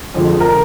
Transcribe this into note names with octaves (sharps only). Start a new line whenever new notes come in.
F2 D3 F3 G#3
A#4